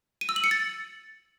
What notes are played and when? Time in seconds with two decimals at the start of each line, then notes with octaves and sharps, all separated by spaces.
0.21 D#7
0.29 E6
0.36 F#7
0.44 C#7
0.51 A6